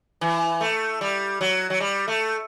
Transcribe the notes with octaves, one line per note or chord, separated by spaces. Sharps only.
E3
A3
G3
F#3
F#3
G3
A3